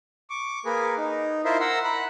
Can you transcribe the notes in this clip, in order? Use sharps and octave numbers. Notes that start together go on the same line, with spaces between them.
C#6 D6
A#3 G#4 A#4 B4
D#4
E4 F4 A#4 C5 E5 C6
A#4 F#5 C6 E6
B5 F#6